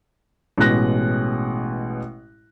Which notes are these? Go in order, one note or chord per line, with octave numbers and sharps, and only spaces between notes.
A1 B2 G#3 F#6 A#6